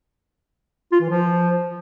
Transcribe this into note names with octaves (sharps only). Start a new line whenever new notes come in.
F4
E3
F3